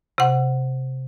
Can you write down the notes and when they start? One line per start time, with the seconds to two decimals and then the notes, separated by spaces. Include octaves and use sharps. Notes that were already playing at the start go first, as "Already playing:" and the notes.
0.18 C3 F#5